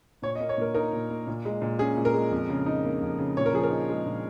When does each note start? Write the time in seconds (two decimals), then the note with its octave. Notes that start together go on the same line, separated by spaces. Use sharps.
0.22 A#2 C#5
0.35 D#5
0.40 A#3
0.49 C#5
0.58 A#2 A#4
0.74 D#4 A#4
0.93 A#2
1.10 A#3
1.27 A#2
1.45 G#3
1.62 A#2
1.79 C#4 G#4
1.97 A#2
2.05 A#4
2.14 G#3
2.31 F2
2.49 C#3
2.66 D#4
2.85 A#3
3.02 F2
3.18 C#3
3.37 A#2 C#5
3.46 A#4
3.53 F3 G#4
3.63 A#4
3.71 D#4
3.89 G#3
4.06 A#2